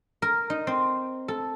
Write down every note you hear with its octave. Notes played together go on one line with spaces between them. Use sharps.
A#4
D#4
C4
A4